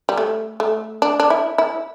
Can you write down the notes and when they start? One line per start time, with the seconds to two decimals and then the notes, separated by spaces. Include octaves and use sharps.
0.09 G3
0.18 A3
0.60 A3
1.02 D4
1.20 D4
1.30 E4
1.58 E4